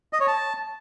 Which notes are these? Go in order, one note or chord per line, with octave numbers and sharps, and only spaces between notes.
D#5
C#5
A5